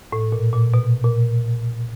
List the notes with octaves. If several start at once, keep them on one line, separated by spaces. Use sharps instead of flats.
A2
A#2
A#2
B2
A#2